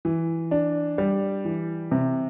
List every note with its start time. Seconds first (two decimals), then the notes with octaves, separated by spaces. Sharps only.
0.05 E3
0.51 D4
0.98 G3
1.45 E3
1.92 C3